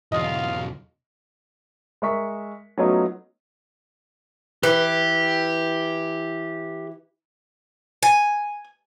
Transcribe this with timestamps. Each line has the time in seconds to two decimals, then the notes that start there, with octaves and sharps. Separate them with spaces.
0.12 B1 E2 F4 D#5 F5
2.02 G#3 A#4 E5 C#6 B6
2.78 F#3 A3 B3 C#4 D#4 F4
4.63 E3 G4
8.03 G#5